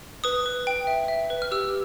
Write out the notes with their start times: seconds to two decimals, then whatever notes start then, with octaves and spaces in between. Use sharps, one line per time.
0.24 B4 D#6
0.46 B4
0.67 G5
0.87 E5
1.08 E5
1.30 B4
1.42 F6
1.51 G4 E6